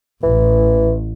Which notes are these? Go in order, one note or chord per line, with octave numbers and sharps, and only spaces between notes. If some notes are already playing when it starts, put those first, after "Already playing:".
A1 E3